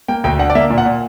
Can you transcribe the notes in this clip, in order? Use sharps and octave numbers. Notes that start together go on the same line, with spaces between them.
A#3 G5
D2 G5
D3 F#5
D5
A#3 E5
A#2
F#5
A#2